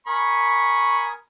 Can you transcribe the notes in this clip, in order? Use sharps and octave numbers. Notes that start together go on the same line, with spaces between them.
A#4 G#5 B5 C#6 D#6